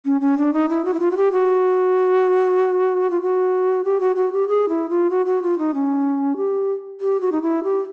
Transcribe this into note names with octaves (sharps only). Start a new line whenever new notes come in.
C#4
C#4
D4
D#4
E4
F#4
E4
F4
F#4
G4
F#4
F4
F#4
G4
F#4
F#4
G4
G#4
E4
F4
F#4
F#4
F4
D#4
C#4
G4
G4
F#4
D#4
E4
G4